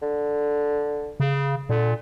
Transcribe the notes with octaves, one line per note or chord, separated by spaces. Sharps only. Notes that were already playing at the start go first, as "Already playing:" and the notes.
D3
C#3
A#2 D3